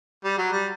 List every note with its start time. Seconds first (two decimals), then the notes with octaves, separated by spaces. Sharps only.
0.25 G3
0.38 F#3
0.52 G3